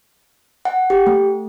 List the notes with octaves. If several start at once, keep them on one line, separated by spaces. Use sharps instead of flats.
F#5
G4
A3